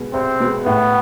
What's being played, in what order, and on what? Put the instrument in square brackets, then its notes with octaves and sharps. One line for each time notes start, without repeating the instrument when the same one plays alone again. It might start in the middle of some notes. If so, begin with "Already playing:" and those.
Already playing: [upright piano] B2 G#3
[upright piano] C2 [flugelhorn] C4
[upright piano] B2 G#3
[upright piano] A2 [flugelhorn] B3